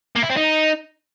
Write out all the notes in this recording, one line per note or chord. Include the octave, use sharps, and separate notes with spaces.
A#3
E4
C4
D#4